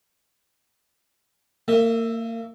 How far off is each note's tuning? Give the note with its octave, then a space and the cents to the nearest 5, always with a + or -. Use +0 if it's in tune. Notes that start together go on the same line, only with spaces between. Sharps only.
A#3 -30 E5 +0